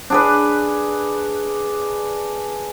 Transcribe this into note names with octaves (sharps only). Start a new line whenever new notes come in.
D4 G#4 B4